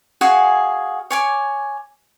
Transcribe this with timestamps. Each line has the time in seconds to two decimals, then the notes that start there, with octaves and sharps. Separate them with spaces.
0.21 F#4 G#4 F5 G#5
1.11 C#5 G#5 D6